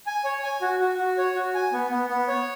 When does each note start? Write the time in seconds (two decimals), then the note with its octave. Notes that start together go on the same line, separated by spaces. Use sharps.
0.07 G#5
0.24 C#5
0.43 G#5
0.61 F#4
0.80 F#4
0.98 F#4
1.18 C#5
1.35 F#4
1.54 G#5
1.73 B3
1.91 B3
2.09 B3
2.28 C#5